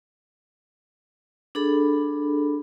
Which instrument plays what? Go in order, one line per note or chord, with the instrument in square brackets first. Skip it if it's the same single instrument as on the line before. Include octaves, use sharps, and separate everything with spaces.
[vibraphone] D4 G#4 A4 B5